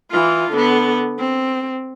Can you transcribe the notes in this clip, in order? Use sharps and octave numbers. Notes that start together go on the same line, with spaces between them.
E3 F4
D3 B3
C4